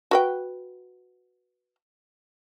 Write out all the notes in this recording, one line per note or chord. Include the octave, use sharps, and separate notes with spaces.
F#4 B4 G5